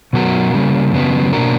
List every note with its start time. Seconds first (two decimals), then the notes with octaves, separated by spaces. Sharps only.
0.13 B2 F#3 B3 F#4 A#4
0.54 C#3 G3 A#3
0.93 F#2 C#3 F#3 B3
1.33 B2 A#3 D4 F#4 A#4